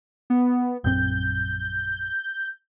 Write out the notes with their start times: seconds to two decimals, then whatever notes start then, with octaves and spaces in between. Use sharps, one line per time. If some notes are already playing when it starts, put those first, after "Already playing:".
0.30 B3
0.84 A#1 F#2 C4 G6